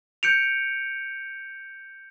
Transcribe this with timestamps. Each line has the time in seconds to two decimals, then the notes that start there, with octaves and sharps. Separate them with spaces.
0.23 G6 C#7 D7 F7